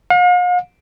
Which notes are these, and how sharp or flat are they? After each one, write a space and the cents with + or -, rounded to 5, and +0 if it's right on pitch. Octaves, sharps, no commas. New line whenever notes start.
F5 +45